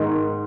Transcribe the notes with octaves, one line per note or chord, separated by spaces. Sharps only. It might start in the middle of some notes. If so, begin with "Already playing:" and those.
Already playing: G#2 D#3 G#3